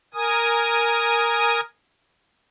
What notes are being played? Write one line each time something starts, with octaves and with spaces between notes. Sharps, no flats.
A#4 G#5 D#6